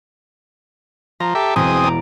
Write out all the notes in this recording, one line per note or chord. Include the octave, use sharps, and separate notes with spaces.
F3 A#5
G4 A4 E5
E1 B2 C4 G#4 D#6
D5 A#5